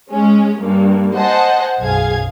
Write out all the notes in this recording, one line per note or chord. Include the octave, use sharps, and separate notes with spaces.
G#3 C#4
G2 A#3
C5 D#5 F#5 G#5 A5
B1 F#2 G#4 F5 G#6